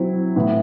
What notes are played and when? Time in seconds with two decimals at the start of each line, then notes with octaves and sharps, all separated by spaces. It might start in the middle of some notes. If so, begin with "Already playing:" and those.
Already playing: F#3 C4 E4
0.36 A2 E3 B3